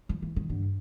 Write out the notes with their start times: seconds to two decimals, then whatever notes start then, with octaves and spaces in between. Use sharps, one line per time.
0.09 F3
0.22 E3
0.36 D#3
0.50 G2 D3